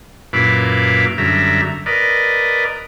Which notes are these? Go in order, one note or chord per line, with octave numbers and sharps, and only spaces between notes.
F#2 A#2 E4 B4 F5 D6
F#2 D3 G3 E5 A#5
A#4 B4 D5 D#5